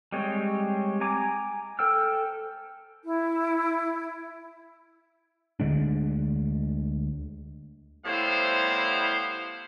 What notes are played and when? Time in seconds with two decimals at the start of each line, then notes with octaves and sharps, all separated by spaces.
0.12 G3 G#3 C4 C#5
1.01 G#5 A#5 D6
1.79 A4 C5 G5 E6 F6
3.03 E4
5.60 D2 D3 G#3 D4
8.05 A2 G3 B3 E4 C5 F5